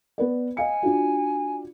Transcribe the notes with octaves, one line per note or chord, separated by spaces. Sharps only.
B3 B4 D5
D#5 F5 G#5 C#7
D4 F4 F#4